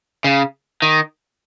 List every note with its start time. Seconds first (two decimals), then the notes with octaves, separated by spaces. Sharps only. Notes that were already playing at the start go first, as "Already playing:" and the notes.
0.24 C#3
0.82 D#3